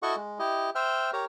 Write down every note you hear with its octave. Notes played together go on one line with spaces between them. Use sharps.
E4 F#4 A4 D#5 F#5 C#6
G#3
E4 G4 D#5
C5 E5 G5 F6
G4 A#4 C#5 A#5